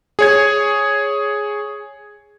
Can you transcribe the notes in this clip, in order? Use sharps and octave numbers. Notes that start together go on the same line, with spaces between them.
G#4 C#5 G#6